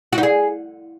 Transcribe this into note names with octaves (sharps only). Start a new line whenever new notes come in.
F#4
D#4
G#4